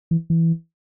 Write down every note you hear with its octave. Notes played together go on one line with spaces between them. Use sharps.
E3
E3